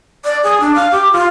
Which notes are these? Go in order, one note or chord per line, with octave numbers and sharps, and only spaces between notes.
D5
G#4
D4
F5
G4
F4